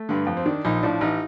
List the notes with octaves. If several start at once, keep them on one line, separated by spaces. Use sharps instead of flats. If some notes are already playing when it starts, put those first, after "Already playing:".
Already playing: A3
G2 D3
F2
C4
D#3 D4
A#1 D#4
A2 F3 D4
A1 D#4